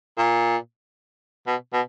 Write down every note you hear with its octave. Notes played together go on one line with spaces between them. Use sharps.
A#2
B2
B2